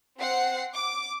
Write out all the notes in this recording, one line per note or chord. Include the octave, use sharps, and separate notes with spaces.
C4 F#5 C7
D6